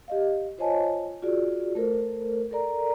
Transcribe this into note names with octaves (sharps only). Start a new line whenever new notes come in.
G4 D#5 F5
F4 C5 C#5 D#5 G#5 A5
F4 F#4 G#4 D5
A3 A4 A#4 C5
A4 A#4 D5 A#5